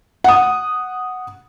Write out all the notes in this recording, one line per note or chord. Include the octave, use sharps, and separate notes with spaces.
F#5 D#6